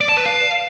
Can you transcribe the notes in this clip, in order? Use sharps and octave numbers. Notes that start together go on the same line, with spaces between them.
D5
A5
B4
F5